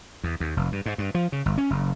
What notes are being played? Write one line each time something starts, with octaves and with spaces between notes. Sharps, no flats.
E2
D#2
F1
G2
G#2
G2
F3
C#3
G1
C#4
F#1